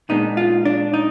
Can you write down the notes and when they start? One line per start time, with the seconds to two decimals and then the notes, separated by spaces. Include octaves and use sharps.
0.09 A#2 G#3 B3 D4 D#4
0.37 F4
0.65 D4
0.94 D#4